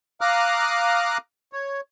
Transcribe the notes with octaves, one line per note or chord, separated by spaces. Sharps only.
F5 A#5 D6 D#6 F6 F#6
C#5